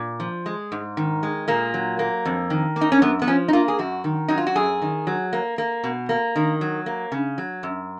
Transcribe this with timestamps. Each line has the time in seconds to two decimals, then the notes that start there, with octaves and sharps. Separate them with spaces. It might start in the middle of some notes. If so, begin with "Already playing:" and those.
Already playing: A#2
0.20 F3
0.46 G#3
0.72 G#2
0.97 D#3
1.23 G#3
1.48 A#2 A#3
1.74 F#3
1.99 A#3
2.25 F2
2.50 D#3
2.76 A#3
2.81 D#4
2.92 C#4
3.02 F#2 B3
3.22 B3
3.27 F3 C#4
3.48 D#4
3.53 A#3 F4
3.68 G#4
3.79 F#2 F#4
4.04 D#3
4.28 F#3 D#4
4.38 F4
4.47 F#4
4.55 F#2 G#4
4.82 D#3
5.07 F#3
5.33 A#3
5.58 A#3
5.84 B2
6.09 A#3
6.36 D#3
6.61 F#3
6.86 A#3
7.12 C#3
7.38 F#3
7.63 F#2